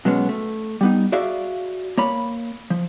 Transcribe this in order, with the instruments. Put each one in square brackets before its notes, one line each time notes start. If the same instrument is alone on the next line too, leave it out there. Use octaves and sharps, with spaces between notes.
[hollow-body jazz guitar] B2 F#3 G#3 B3 C#4
A3
G3 B3 D#4
F#4 G#4 D5 E5 F5
A#3 C#5 B5
F3